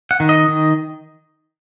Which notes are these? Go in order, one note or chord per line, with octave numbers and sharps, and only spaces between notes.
F#5
D#3
D#5
D#3